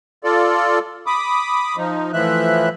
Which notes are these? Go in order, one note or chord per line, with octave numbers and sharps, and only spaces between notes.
F4 A4 D5
B5 D6 D#6
F3 D#4
A2 E3 F3 E5 F#6